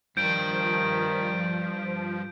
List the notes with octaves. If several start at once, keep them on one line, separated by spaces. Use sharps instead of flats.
G2 D#3 F3 G3 G6 D7